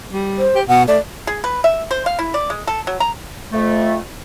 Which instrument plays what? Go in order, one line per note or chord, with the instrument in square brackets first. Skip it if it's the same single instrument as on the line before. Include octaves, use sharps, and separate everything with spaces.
[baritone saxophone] G3
[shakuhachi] C5
[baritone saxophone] G4
[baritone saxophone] B2 [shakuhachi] F#5
[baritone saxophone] A3 [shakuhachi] D5
[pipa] G#4
B4
E5
C5
F5
E4
D5
G#3
A4
F#3
A#5
[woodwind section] F2 A3